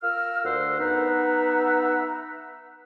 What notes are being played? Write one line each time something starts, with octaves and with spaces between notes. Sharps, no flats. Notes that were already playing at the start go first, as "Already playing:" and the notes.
F4 A#4 E6 F6
D2 A#4 C5 F#5 E6
B3 D#4 E5 F#5 A#5